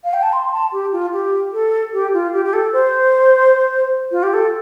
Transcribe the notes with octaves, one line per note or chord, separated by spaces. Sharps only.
F5
G5
A5
C6
C6
A5
G4
F4
G4
A4
G4
F4
G4
G4
A4
C5
F4
G4
A4